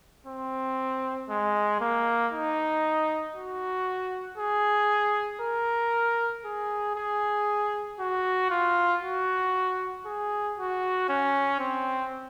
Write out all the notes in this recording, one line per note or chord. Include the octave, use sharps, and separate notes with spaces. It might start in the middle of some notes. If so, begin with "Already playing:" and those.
C4
G#3
A#3
D#4
F#4
G#4
A#4
G#4
G#4
F#4
F4
F#4
G#4
F#4
C#4
C4